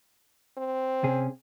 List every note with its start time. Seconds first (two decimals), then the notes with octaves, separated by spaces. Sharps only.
0.57 C4
1.04 C3 C#4 G#4